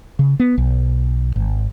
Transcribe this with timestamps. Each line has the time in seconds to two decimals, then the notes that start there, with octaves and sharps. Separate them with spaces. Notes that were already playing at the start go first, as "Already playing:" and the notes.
0.19 C#3
0.40 B3
0.58 B1
1.36 G#1